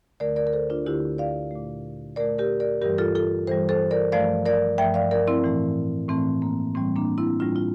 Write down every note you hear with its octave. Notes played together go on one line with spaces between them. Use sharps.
D2 D3 A3 A#4 D5
A#4 D5
A#4
A4 C5
D4 F4
D2 D3 A3 E4 G4
D5 F5
A#2 A3
A#2 A3 A#4 D5
G4 A#4
A#4 D5
G2 E3 G3 G4 A#4
F4 A4
F4 A4
G2 E3 G3 A4 C5
A4 C5
A#4 D5
G2 F3 A3 D5 F5
A#4 D5
G2 F3 A3 E5 G5
D5 F5
A#4 D5
C4 E4
A2 E3 A3
A2 E3 A3 C4
A#3
A2 E3 G3 C4
A#3 D4
C4 E4
A2 E3 G3 D4 F4
F4